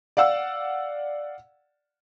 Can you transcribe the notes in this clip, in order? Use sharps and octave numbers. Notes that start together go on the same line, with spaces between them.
D5 F5 F#5 E6